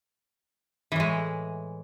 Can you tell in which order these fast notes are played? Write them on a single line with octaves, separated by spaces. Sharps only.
E3 A2 G#3